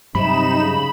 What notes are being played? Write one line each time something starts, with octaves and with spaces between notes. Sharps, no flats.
G2 C3 F#3 G3 D#4 B5 E7
C#3